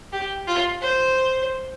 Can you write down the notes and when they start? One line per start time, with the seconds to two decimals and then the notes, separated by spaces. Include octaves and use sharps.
0.12 G4
0.47 F4
0.81 C5